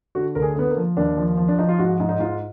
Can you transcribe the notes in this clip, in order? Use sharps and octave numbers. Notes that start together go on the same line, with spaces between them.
D3 F#4
D2 A#4
G#4
D3 B3
A#3
F3
D#2 D4
F3
F3
D4
F3 D#4
F4
G#2 F#4
G#2
D#4
G#2 F4